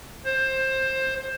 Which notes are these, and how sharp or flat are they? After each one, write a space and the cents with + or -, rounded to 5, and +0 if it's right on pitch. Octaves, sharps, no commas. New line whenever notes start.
C5 +20